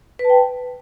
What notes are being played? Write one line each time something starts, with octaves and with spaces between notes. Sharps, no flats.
B4
A5
G5